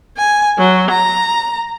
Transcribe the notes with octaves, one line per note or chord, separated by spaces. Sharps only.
G#5
F#3
A#5